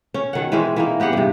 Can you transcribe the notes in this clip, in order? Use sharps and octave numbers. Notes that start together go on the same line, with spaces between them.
C#4
B2 D#3 F#5
E3 G#3 C4 C#4
E3 A#3 D#4
B3 G4 G#4 F#5
G2 C3